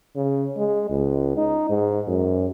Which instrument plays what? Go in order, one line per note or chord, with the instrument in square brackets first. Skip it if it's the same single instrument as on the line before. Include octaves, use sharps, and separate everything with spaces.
[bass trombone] C#3
G#3
C#2
D#4
G#2
F#2